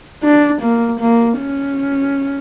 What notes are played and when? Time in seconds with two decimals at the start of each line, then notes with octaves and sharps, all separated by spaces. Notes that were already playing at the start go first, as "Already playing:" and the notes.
0.24 D4
0.62 A#3
1.01 A#3
1.39 C#4